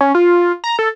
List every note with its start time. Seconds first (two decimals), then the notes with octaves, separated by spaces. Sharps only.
0.01 C#4
0.15 F4
0.64 A#5
0.79 A4